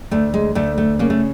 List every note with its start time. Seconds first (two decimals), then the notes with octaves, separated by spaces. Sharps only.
0.11 D2 A3
0.34 G#3
0.55 D2 A3
0.78 A3
0.99 C#3 A#3
1.10 A3